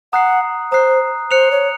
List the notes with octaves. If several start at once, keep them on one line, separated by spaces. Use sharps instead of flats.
F#5 A#5 D#6 F#6 C7
C5 A#5 D#6 F#6 C7
C5 F#6 C#7 F7
C#5